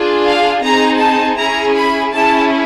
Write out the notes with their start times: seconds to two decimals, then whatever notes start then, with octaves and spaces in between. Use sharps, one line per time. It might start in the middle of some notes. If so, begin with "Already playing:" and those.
Already playing: D4 F4 G#4
0.26 F5
0.64 C4 D#4 G#4 A#5
1.01 A5
1.38 C#4 E4 G#4 A#5
1.76 B5
2.14 C#4 E4 G#4 A5